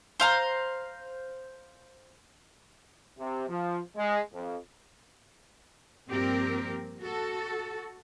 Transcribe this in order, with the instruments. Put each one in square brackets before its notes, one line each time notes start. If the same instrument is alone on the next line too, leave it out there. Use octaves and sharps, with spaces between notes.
[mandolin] C5 F5 A#5
[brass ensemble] C3
F3
G#3
F2
[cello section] G2 A#2 F3 C4 G4 A#4
F#4 A4